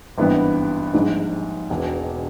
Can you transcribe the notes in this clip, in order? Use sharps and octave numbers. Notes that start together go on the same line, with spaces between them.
G#1 G2 E3 G3 B3
A#1 G#2 G3
E1 E2 B2